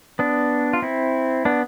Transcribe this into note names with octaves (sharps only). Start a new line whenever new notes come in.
B3 D4
F4
C4 E4
B3 D4